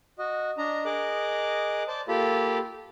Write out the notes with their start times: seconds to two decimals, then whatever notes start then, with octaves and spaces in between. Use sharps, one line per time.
0.19 F#4 D#5
0.58 D4 D#5 A#5
0.85 G#4 A#4 D#5 D6 F#6
1.88 C5 D5 A5
2.08 A#3 F4 G4 A4 B5